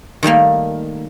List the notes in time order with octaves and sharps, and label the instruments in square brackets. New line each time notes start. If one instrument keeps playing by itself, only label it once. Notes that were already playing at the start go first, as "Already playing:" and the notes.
[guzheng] D#3 G3 A3 A#3